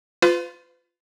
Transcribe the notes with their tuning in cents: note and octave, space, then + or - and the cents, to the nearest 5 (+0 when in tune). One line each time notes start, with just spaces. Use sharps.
F4 +0 B4 +40